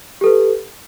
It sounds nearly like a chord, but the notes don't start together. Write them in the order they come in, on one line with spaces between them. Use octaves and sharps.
G4 A4 B4